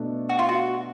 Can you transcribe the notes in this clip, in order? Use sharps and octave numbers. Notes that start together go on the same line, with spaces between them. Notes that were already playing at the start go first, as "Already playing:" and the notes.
Already playing: B2 A3 D4
F#4
F4
F#4